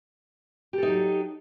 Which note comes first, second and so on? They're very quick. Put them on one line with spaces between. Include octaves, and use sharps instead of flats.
G4 A4 D#4 F#3